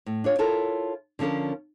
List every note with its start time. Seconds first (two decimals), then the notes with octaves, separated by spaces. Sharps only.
0.06 A2
0.24 D4 F4 C#5
0.38 E4 F4 A4 A#4 C#5
1.19 D3 F3 C#4 D4 A#4